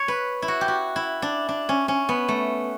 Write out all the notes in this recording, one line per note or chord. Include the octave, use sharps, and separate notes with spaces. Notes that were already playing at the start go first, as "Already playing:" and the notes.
Already playing: C#5
B4
E4
F#4
G4
F#4
E4
D4
D4
C#4
C#4
B3
A3